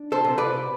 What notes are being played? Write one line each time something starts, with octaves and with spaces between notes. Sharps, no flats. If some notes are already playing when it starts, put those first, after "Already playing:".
Already playing: D4
A4 C5
C3
B4 D5